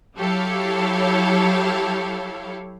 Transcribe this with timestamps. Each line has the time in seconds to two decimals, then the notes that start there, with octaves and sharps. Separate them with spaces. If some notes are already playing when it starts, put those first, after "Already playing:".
0.16 F#3 E4 G4 A4 C#5 F5